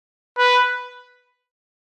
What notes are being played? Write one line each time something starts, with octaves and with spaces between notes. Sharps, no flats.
B4